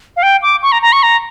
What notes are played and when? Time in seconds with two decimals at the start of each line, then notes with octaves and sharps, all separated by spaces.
0.17 F5
0.23 G5
0.42 D6
0.62 C#6
0.72 A#5
0.82 A#5
0.93 C#6
1.03 A#5